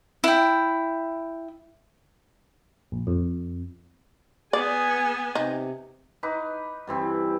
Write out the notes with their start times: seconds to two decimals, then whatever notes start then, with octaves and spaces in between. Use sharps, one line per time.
0.24 E4 G5
2.92 A#1
3.07 F2
4.53 B3 G#4 D5 G#5
5.35 C3 D#4
6.23 D#4 B4 D6
6.87 G2 E3 C4